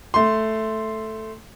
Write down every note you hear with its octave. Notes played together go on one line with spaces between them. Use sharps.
A3 C6